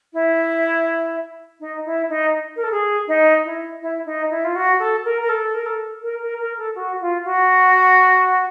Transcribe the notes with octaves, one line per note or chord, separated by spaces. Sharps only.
E4
D#4
E4
D#4
A#4
A4
G#4
D#4
E4
E4
D#4
E4
F4
F#4
A4
A#4
A#4
A4
A#4
A4
A#4
A#4
A#4
A4
F#4
F4
F#4